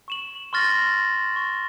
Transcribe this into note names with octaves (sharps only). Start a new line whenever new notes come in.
C#6 E7 F#7
C6 C#6 F6 A6 A#6
C#6